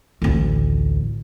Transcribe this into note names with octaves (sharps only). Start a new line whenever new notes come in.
A1 D2